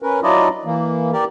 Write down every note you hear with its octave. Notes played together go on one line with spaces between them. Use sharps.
C#4 A#4 B4
F#3 D4 E4 F4 D5 D#5
E3 A#3
G4 A#4 D5